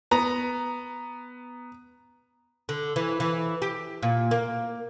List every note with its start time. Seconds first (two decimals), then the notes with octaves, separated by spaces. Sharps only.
0.11 B3 A#5
2.69 D3
2.96 E3
3.20 E3
3.62 G4
4.03 A#2
4.31 A#3